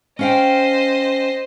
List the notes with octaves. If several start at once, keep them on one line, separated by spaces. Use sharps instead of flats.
C#4 C5 D#5 F5 G5